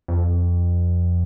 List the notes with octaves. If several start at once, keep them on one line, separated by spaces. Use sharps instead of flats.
F2